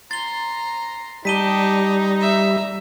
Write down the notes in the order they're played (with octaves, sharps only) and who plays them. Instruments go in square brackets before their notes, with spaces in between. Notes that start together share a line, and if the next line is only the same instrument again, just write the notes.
[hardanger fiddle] A#5 C6 [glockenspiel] A6 G7
[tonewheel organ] G3 [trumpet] D#4 [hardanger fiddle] G4 A5 [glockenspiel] B6 D#7 G7
[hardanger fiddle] E5 A#5